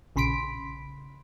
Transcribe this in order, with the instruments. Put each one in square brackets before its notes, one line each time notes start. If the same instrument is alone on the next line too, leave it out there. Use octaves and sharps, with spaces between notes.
[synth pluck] A#1 C#3 B5 C6 B6 D7